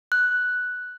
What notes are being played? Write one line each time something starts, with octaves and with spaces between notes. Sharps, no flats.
F#6